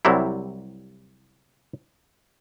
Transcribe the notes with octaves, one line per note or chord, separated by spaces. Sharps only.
C2 C3 F#3 G3 E4